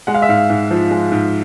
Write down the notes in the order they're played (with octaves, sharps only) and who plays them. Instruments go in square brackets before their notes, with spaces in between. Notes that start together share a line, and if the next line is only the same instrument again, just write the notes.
[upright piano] G#3 F#5
F5
E5
G#2 F5
G#2
F3
G#3
G#2